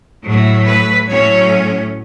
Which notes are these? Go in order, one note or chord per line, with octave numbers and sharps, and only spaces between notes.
A2 F#3 A3
B4
A2 F#3 A3 C#4 C#5